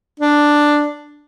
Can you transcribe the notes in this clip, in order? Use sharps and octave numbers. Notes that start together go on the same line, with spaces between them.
D4